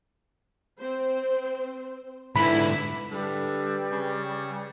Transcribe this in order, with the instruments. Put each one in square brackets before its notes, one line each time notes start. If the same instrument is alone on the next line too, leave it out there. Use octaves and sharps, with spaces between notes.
[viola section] C4 C5
[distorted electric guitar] G#2 D3 [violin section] E4 B6 [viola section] B4 [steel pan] B5
[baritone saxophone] D3 [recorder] G3 [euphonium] B4
[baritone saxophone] C#3